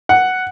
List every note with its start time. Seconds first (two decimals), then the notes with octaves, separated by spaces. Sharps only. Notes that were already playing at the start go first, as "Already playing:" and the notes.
0.09 F#5